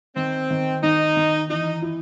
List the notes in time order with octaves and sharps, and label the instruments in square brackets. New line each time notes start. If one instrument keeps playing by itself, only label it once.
[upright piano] D#3 [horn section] C4
[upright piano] D#3
[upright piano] D#3 [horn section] D#4
[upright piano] D#3
[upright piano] E3 [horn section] D#4
[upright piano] E4